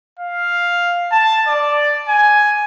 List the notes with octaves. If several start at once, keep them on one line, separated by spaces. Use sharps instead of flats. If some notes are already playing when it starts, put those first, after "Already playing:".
F5
A5
D5
G#5